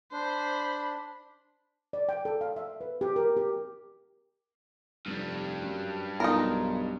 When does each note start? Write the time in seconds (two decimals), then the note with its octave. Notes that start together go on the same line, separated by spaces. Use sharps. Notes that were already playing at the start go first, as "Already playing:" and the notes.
0.12 D4 C5 B5
1.93 D5
2.09 G5
2.25 A4
2.41 F5
2.56 E5
2.81 B4
3.01 G4
3.16 A#4
3.37 G4
5.06 F1 G2 G3
5.62 F#2
6.20 B1 D#4 F4 A#4